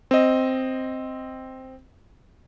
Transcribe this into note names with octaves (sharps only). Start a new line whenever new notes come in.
C4 D#5